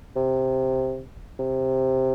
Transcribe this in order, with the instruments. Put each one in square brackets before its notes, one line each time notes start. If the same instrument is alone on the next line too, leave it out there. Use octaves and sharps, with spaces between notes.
[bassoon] C3
C3